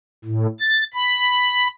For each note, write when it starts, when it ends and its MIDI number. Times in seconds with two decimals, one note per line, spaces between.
0.25 0.46 45
0.60 0.84 93
0.94 1.67 83